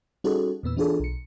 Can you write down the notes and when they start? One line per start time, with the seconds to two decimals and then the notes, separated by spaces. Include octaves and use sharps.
0.24 G3 C#4 D#4 F#4 G#4 A4
0.63 E2 A#2 B3 E6
0.77 E3 B3 D4 F4 G#4 A4
0.99 B1 C#7